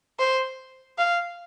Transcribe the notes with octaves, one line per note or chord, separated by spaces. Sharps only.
C5
F5